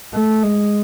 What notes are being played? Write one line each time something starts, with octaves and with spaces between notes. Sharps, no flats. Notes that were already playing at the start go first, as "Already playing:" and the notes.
A3
G#3